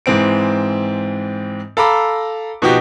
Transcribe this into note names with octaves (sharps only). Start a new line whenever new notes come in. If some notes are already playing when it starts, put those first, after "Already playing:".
G#2 E3 C4 D7
A4 F5 A#5 B5 D6
B2 F3 D#4 F#4 G4